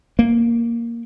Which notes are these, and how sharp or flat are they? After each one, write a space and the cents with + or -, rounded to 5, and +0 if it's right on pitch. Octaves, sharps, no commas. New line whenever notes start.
A#3 +0